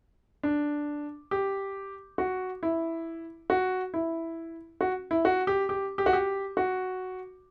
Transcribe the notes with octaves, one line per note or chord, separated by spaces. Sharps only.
D4
G4
F#4
E4
F#4
E4
F#4
E4
F#4
G4
G4
G4
F#4
G4
F#4